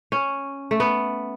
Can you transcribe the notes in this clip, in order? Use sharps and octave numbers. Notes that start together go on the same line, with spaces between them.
C#4
A3
B3